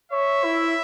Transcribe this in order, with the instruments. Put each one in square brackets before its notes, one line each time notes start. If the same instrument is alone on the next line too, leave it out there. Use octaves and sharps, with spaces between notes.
[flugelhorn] C#5 [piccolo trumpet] E5
[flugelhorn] E4